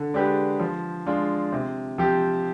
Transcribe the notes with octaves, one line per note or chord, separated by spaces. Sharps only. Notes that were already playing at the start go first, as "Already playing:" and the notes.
Already playing: D3
G#3 D4 G4 B4
F3
G#3 D4 F4
C3
F3 C4 G4